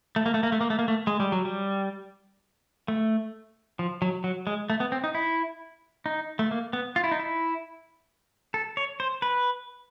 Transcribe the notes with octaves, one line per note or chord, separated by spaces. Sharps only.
A3
A#3
A3
A#3
A3
A#3
A3
A#3
A3
G#3
G3
F#3
G3
A3
F3
F#3
F#3
G#3
A3
B3
C4
D#4
E4
D#4
A3
A#3
B3
F4
E4
D#4
E4
A4
C#5
C5
B4